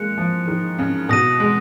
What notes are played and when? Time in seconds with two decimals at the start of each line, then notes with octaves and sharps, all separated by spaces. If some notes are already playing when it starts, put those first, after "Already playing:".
Already playing: G#3 A#3 F#6 C#7
0.18 F3
0.48 D#3
0.79 C#3
1.09 B2 D#6 A#6 D#7
1.40 G#3